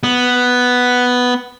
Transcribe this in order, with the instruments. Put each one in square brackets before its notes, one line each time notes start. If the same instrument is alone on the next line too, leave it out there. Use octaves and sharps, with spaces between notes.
[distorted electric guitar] B3